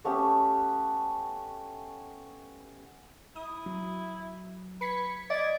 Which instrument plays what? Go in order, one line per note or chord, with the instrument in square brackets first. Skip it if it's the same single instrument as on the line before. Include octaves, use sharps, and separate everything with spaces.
[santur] A3 B3 C#4 G4
[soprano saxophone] E4 [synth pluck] D#6
[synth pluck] F#3
[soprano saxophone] B4 [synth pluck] G#6 B6 C#7
[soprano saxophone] D5 [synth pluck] D#5 G#6